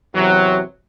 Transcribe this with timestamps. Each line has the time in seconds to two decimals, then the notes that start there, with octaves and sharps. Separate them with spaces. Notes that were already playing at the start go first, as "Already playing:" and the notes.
0.12 E2 C3 F#3